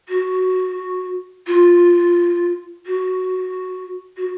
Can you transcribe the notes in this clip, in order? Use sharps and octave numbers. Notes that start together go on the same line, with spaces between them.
F#4
F4
F#4
F#4